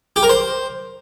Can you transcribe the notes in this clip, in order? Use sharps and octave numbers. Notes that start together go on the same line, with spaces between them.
G4
A#4
C5